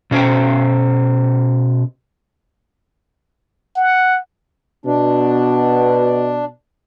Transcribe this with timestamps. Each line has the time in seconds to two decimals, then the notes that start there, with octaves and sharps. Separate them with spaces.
0.11 B2 C#4 C5 G5
3.76 F#5
4.86 B2 D4